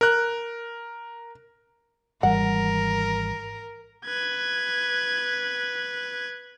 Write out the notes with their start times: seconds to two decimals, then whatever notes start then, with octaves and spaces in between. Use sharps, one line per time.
0.01 A#4 F#6
2.23 G#1 E3 G3 A#4 F#5
4.05 B4 G#6